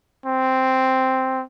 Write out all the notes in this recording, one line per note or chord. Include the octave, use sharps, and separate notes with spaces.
C4